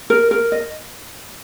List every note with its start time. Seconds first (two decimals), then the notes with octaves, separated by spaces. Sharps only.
0.10 A#4
0.31 A#4
0.52 D#5